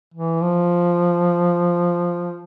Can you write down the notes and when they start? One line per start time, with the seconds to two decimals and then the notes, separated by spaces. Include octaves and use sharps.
0.14 E3
0.42 F3